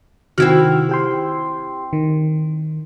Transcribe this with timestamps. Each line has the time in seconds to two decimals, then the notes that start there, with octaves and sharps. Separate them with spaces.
0.38 C3 D#3 C4 E4 F#4 F6
0.89 G4 G5 C6
1.93 D#3